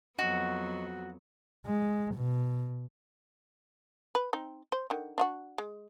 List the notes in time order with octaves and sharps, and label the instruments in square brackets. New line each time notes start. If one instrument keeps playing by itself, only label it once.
[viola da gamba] F2 F#3 B3 [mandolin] F#4 [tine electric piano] D#5 F#5 C#6
[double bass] G#3
B2
[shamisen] B4
C4 D#4
C5
D3 D#3
D4 F4 F#4
G#3